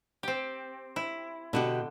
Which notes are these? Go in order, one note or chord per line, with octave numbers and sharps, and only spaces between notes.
C4 G4
E4
B2 D3 F#4 G4